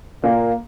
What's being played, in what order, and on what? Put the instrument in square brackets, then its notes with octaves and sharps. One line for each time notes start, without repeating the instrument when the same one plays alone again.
[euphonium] A#2 [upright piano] A#3